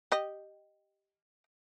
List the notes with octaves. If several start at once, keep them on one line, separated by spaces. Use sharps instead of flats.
G4 D#5